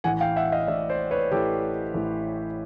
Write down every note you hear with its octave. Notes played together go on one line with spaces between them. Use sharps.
A1 A2 E3 F#5 G#5
F5 G5
E5 F#5
D#5 F5
A1 A2 E3 D5 E5
C5 D5
B4 C#5
A1 A2 E3 G4 A4
A1 A2 E3